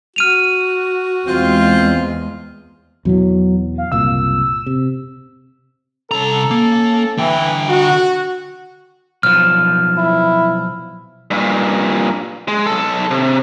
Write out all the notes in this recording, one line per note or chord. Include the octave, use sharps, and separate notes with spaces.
F#4 F6 D#7 F7
E2 G#3 C4 F4
E2 B2 E3 F#3
F5
F#1 C2 A#2 E6
C3
C2 C#4 A4 A#5
A#3
D3 E3 G5
F#4
B1 F3 F6
E4
G2 A#2
G#3
B1 A4
C3